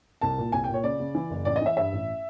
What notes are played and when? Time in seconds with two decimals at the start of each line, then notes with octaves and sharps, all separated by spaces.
0.21 C2 A5
0.38 A#2
0.52 C2 G#5
0.64 G5
0.69 A#2 C#5
0.84 C#3 D5
1.00 C#3
1.15 E3
1.30 F#1
1.45 A1 D5
1.56 D#5
1.61 E3 E5
1.76 G2 E5
1.93 A1